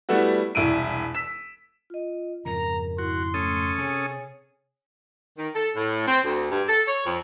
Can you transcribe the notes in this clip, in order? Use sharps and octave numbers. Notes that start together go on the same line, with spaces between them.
G3 A3 B3 E4 F#4
E1 C2 E4 E6 D7 D#7
E6 B6 E7
F4 D#5
F2 G#2 C#3 A#4 A#5
E4 F#4 C6
A3 C#4 A4 D#6
C3 G#4 C#5
D#3
A4
A2
C4
D2
G2
A4
C#5
F2